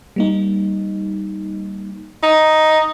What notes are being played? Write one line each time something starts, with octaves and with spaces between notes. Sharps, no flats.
G3 A#3 D#4
D#4